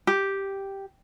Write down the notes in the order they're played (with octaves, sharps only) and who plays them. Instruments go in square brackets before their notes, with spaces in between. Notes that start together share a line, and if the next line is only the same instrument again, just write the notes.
[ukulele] G4